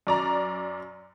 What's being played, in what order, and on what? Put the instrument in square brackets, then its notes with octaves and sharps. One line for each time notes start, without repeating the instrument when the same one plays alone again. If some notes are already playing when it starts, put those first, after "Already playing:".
[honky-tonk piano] F#2 D5 A#5